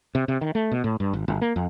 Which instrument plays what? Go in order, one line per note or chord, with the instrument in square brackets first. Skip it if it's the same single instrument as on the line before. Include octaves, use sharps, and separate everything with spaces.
[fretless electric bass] C3
C3
D#3
A3
B2
A2
G2
G#1
G1
A#3
F2